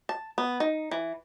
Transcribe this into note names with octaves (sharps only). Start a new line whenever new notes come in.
A5
B3
D#4
E3